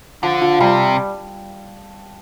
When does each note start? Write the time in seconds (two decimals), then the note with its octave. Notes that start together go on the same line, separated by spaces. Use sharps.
0.23 D3 F3
0.42 F3
0.60 C3 G3